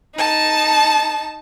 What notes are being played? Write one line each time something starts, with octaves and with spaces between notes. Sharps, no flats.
D#4 A5